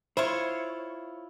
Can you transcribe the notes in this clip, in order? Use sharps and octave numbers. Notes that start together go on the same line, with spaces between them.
E4 F4 C5 C#5